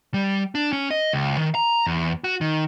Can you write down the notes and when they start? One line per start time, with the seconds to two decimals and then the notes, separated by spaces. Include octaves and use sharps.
0.14 G3
0.55 D4
0.73 C#4
0.91 D#5
1.13 C#2
1.38 D#3
1.55 A#5
1.87 E2
2.24 F#4
2.41 D#3